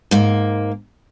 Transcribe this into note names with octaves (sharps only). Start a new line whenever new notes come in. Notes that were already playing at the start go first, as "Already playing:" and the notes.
G#2 A#3